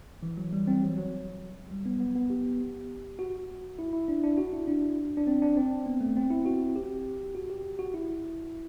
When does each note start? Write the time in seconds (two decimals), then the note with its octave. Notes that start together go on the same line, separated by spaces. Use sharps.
0.23 E3
0.38 F#3
0.53 G3
0.67 C4
0.83 F#3
0.98 F#3
1.71 G3
1.86 B3
2.00 B3
2.15 B3
2.30 G4
3.19 F#4
3.79 E4
3.93 E4
4.08 D4
4.24 D4
4.38 F#4
4.53 E4
4.67 D4
5.17 D4
5.27 C4
5.42 D4
5.57 C4
5.86 B3
6.01 A3
6.17 C4
6.30 E4
6.46 F#4
6.76 G4
7.35 F#4
7.50 G4
7.79 F#4
7.94 E4